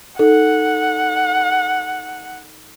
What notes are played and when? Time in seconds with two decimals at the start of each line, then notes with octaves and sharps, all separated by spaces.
0.19 D#4 A4 F#5